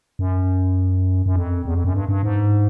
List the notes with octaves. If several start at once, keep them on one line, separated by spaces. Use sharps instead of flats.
F#2
F#2
F2
E2
F2
F#2
G2
G2
G#2